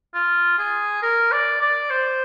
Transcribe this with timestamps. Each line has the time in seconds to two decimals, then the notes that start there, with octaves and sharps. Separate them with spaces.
0.14 F4
0.58 G#4
1.02 A#4
1.32 D5
1.61 D5
1.90 C5